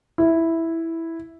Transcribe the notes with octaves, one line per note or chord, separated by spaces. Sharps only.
E4